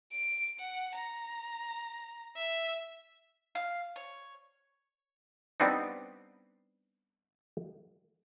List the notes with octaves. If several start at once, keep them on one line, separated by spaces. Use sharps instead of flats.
D7
F#5
A#5
E5
F5
C#5
G3 B3 C4 D4 D#4